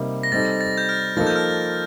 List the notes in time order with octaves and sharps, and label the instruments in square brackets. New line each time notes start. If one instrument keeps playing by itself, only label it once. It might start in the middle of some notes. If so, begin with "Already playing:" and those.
Already playing: [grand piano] C3 G3 A#3 D#4
[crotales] A#6
[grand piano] G3 C4 D#4 A4 [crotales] A6
[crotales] A6
G6
F6
[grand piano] F3 A#3 D#4 A4 [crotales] A6
[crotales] G6
F6